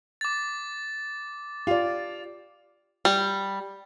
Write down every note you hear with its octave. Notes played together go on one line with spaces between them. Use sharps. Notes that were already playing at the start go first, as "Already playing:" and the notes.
D6 A6
F4 G4 D5
G3